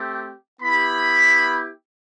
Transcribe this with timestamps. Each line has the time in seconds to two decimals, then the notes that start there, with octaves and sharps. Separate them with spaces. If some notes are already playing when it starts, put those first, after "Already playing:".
Already playing: A3 C4 G4
0.61 B3 E4 G4 B5